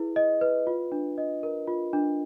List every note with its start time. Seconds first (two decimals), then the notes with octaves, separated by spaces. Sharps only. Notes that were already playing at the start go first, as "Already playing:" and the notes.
Already playing: E4 G#4 B4
0.16 D#5
0.41 B4
0.67 F4
0.92 D4
1.18 D#5
1.43 A#4
1.67 F4
1.93 D4